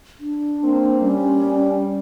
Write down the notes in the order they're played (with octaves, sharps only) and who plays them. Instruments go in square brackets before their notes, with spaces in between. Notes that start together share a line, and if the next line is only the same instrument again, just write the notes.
[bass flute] D4
[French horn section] A#3 C4
[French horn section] G3 [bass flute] C#4